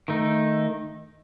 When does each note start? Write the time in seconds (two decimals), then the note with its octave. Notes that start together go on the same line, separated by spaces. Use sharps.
0.08 D#3 A3 D#4